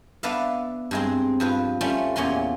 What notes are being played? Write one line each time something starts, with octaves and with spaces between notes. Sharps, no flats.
B3 D4 B4 D5 E5 F5
G2 G#3 C4
G2 F3 B4
G3 A3 C#4 F4
E2 A#2 C#4 F4 C6